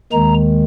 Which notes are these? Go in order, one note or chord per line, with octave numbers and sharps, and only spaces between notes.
D#2 D#3 G#3 A#5